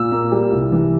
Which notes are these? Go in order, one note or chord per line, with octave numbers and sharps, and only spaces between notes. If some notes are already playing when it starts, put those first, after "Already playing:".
Already playing: A#2 E6
A#3
G3
C2
E3